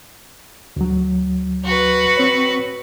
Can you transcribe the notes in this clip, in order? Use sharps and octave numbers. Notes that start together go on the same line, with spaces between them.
D2 F#3
F#4 B4
C4 C#5